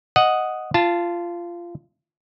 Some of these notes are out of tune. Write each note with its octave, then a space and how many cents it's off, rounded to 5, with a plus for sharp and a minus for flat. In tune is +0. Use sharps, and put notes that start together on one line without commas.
D#5 +0 F#5 +0
F4 -15 A5 +0